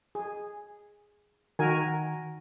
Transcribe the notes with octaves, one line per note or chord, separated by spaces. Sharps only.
G#4
D#3 F#4 A#4 G#5